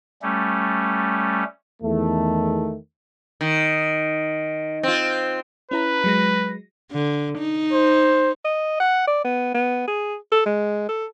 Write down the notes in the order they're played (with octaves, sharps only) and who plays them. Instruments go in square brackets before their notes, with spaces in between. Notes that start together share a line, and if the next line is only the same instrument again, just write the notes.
[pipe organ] G3 A3 C#4
[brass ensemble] E2 D#3 A3
[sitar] D#3
C4 F4
[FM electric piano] C#4 E4 A#5 [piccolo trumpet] B4
[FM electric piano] F#3 G#3 A#6
[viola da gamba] D3
D#4
[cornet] C5
[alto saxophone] D#5
F#5
D5
B3
B3
G#4
A4
G#3
A4